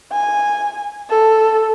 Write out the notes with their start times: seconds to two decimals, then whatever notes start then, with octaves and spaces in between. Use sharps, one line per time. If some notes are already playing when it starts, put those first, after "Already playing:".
0.12 G#5
1.10 A4